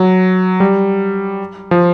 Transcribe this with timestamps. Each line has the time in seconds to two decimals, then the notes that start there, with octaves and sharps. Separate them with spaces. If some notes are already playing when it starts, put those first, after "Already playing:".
Already playing: F#3
0.60 G3
1.71 F3